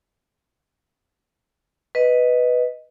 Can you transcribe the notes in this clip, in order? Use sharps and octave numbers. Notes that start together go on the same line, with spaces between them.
B4 D#5